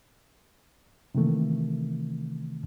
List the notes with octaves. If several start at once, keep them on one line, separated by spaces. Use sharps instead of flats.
C3 D#3 E3 A3 A#3